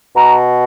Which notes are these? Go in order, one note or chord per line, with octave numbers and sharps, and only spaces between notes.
B2 A#5